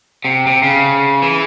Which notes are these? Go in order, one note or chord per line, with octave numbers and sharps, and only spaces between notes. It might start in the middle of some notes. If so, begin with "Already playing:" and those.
C3
C3
C#3
E3